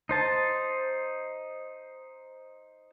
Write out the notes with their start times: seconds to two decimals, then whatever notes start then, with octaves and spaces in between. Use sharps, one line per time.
0.09 D#4 C5 A5